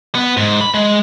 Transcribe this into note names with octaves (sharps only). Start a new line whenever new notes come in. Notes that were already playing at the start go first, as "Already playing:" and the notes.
B3
G#2
B5
G#3